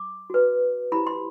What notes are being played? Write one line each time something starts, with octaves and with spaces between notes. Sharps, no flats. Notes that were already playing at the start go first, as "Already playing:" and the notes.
Already playing: D6
F#4 B4
E4 G4 C5 B5
C6